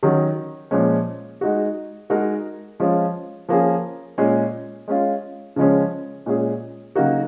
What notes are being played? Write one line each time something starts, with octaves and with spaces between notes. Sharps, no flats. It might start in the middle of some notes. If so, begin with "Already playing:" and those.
D#3 F#3 C#4
A#2 F3 G#3 C#4
G#3 D#4 F#4
G#3 D#4 F#4 A#4
F3 G#3 C#4 F4
F3 A#3 C#4 G#4
A#2 G#3 C#4 G#4
G#3 C#4 F4
C#3 F3 G#3 C#4
A#2 G#3 C#4 G#4
C#3 F#3 A#3 D#4 F#4